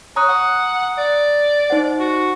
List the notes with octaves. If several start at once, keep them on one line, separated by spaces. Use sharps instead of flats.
C#5 A#5 D#6 F#6
F#5
D5
D#4 C5 F#5
F#4